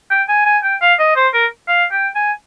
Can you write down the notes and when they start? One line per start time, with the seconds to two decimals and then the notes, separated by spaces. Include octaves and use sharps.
0.11 G5
0.28 G#5
0.46 G#5
0.64 G5
0.82 F5
0.99 D#5
1.16 C5
1.34 A#4
1.68 F5
1.92 G5
2.15 G#5